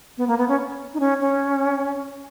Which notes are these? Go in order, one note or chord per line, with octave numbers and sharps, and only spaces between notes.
B3
A#3
B3
C#4
D#4
C#4
C#4